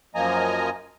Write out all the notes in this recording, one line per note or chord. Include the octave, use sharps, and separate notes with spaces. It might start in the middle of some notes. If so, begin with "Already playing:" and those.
F#2 F3 A#3 D#5 G#5 A#5